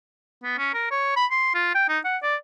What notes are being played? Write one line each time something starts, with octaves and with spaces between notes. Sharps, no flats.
B3
C#4
A#4
C#5
B5
C6
F4
G5
D#4
F#5
D5